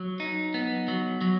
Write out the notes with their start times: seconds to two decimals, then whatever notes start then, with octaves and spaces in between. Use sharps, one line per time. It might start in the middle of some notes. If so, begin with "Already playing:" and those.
Already playing: F#3
0.20 D#4
0.54 B3
0.88 F#3
1.21 F#3